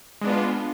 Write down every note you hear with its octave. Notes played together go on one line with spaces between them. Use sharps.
G#3 B3 D4 F4